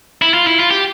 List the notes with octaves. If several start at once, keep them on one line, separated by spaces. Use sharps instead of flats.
E4
F4
E4
F4
G4